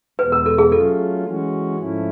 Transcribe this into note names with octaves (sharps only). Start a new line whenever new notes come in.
E2 B2 G#3 B3 B4
A#4
A4
G#4
F#3 A3 C#4 F4 A4
E3 G#3 C#4 F#4
G#2 F3 A3 C#4 E4